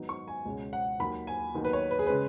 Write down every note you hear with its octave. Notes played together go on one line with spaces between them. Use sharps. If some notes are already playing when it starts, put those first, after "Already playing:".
Already playing: G#2 D#3 F#3 B3 D#4
C#6
G#5
C#2 B2 G#3 C#4
F#5
D#2 D#3 F#3 B5
G#5
D#2 D#3 F#3 B3 D#4
B4
C#5
B4
G#4
C#3 G#3 C#4 B4